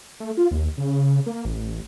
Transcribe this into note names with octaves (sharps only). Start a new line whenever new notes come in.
A3
F4
D#2
C#3
A#3
A1